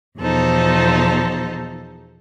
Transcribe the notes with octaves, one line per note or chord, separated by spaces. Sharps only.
E2 B2 F3 D#4 A4 C5